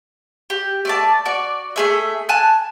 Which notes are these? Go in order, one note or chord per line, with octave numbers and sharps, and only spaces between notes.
G4
A3 D5 A5
F#4 D5
A3 G#4 E5
G#5 A5 F#6